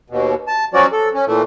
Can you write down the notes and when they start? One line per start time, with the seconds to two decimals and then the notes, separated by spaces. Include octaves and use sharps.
0.10 D#2 B2
0.48 A5
0.74 F3 F#3 C#4 F#4 D5
0.92 A4
1.14 C#4
1.27 A#2 E3 A3